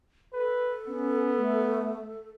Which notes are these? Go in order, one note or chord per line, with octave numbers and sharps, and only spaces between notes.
A4 B4
B3 C#4
A3